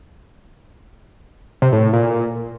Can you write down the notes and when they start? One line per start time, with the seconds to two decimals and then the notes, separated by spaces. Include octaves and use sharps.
1.62 C3
1.72 A2
1.83 A2
1.93 A#2